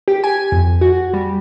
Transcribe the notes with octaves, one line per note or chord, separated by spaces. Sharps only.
G4
G#5
F2
F#4
G3